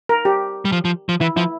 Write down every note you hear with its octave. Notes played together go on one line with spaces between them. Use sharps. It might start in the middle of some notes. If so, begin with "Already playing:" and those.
A#4
G4
G3
F3
F3
F3
E3 E4
F3 E4